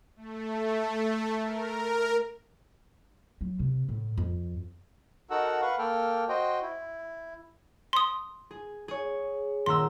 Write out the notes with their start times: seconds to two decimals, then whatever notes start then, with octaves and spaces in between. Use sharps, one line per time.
0.16 A3
1.43 A#4
3.41 F#3
3.59 C3
3.89 A2
4.17 F2
5.30 D#4 F#4 A4 A#4 F#5 E6
5.62 B4 F5 F#5 C#6
5.78 A#3 A4 G5 F6
6.29 F#4 C5 D#5 G5
6.62 E4
7.93 C6 D#6
8.51 G#4
8.88 G#4 C#5
9.66 D#1 A#5 C6 E6